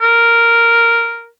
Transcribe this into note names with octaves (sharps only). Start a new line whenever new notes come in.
A#4